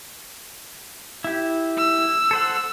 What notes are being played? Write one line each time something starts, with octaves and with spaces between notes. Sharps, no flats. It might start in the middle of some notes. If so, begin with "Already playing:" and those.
E4 G4
E6
A4 C5 F#5